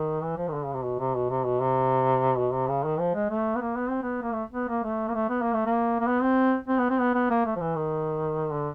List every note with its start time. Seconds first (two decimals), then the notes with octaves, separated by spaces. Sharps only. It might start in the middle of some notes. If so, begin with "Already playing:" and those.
Already playing: D#3
0.22 E3
0.37 F3
0.48 D#3
0.54 D3
0.64 C#3
0.74 C3
0.84 B2
1.00 C3
1.15 B2
1.30 C3
1.45 B2
1.61 C3
2.38 B2
2.53 C3
2.69 C#3
2.84 D#3
2.99 F3
3.14 G#3
3.30 A3
3.56 B3
3.61 A#3
3.76 B3
3.89 C4
4.03 B3
4.22 A#3
4.33 A3
4.53 B3
4.69 A#3
4.84 A3
5.08 A#3
5.14 A3
5.29 B3
5.42 A#3
5.53 A3
5.66 A#3
6.00 A#3
6.07 B3
6.22 C4
6.68 C4
6.79 B3
6.90 C4
6.99 B3
7.15 B3
7.30 A#3
7.46 A3
7.56 F3
7.60 E3
7.76 D#3
8.53 D3